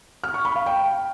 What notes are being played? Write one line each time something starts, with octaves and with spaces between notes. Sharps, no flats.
F6
C#6
B5
F5
G5